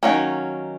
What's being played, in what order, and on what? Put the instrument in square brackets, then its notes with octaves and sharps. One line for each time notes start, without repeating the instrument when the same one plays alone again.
[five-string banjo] D#3 F#3 A#3 C#4